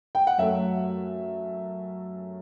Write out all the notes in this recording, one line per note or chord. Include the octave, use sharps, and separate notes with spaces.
G5
F#5
F#2 F#3 A3 E5